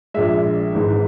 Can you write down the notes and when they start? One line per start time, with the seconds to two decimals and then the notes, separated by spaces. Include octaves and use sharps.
0.14 A#1 A#2 G#3 E5
0.75 G#1 G#2 E3 G#3